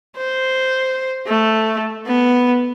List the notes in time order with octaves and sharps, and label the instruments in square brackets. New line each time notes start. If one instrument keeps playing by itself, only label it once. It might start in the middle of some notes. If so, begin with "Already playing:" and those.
[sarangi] C5
A3
B3